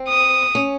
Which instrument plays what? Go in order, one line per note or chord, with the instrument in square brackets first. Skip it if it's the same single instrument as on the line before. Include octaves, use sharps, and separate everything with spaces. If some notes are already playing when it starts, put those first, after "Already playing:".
Already playing: [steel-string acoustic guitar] C4
[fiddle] D#6
[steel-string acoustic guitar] C#4